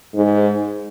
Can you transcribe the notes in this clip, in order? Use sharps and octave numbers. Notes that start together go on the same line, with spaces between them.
G#2